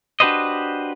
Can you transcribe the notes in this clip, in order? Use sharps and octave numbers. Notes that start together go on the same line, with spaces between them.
D4 F#4 G4 B4 C5 D#5